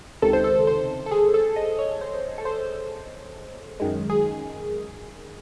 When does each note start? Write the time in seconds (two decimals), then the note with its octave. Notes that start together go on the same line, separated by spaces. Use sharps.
0.22 C#2 C3 D#3 A4
0.33 C5
0.44 A4
0.67 C5
1.06 A4
1.11 G#4
1.34 A4
1.56 D#5
1.79 C#5
2.01 C5
2.38 A4
2.45 C5
3.80 F#2 D#3 G#3
4.10 G#4